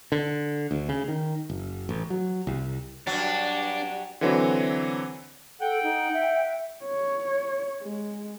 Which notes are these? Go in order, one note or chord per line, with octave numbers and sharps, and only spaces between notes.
D3
D2
C#3
D#3
F#1
A1
F#3
C2
G2 F#3 D4
D3 E3 F#3 C4
A4 F#5 G5
D#4
E5
C#5
G#3